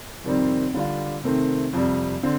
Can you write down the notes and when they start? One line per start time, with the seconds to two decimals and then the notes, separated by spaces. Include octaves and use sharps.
0.24 F2 C3 D#3 G3 C4
0.74 D3 G3 D4 F4
1.24 C3 D#3 A3 C4
1.73 F2 C3 G3
2.23 D3 C4